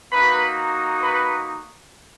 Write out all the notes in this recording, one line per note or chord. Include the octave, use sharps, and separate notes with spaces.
A#3 D#4 F#4 B4 B5
B4 B5